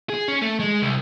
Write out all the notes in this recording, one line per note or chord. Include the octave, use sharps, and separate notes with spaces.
G#4
C#4
A3
G#3
C2